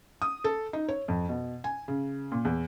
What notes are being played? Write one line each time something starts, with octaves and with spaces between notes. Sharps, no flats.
D#6
A4
D#4
C#5
F2
B2
G#5
C#3
A#2
E2